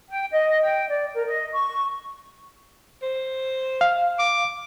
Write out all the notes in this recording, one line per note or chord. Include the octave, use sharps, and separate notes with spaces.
G5
D#5
G5
D5
A#4
D#5
C#6
C5
F5
D6